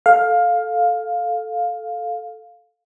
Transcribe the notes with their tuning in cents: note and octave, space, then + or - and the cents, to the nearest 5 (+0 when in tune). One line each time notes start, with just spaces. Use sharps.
A4 -5 F5 +10